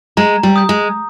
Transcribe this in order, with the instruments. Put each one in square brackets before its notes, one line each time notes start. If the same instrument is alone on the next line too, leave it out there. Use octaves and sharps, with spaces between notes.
[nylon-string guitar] G#3 [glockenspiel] A#5
[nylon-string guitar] G3
[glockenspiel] D#6 G6
[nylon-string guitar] G#3